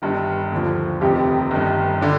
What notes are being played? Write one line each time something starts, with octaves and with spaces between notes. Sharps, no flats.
G1 G2 D#3
D#2 D3 F3
F1 F2 C3 D#3 G4
G1 G2 D#3
D3 D4